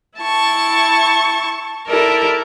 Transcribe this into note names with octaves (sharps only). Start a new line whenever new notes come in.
E4 A5 C#6
E4 A4 A#4 D5